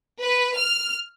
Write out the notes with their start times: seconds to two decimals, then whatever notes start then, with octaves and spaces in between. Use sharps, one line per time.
0.21 B4
0.57 F6